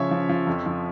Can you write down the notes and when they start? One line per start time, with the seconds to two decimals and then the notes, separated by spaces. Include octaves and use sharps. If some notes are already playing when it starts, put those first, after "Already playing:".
Already playing: C#3 F3 C#5 E5
0.11 F3
0.29 F3
0.47 F2
0.66 F3